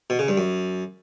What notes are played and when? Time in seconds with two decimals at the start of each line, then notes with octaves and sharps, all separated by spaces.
0.10 B2
0.19 C#3
0.28 G2
0.38 F#2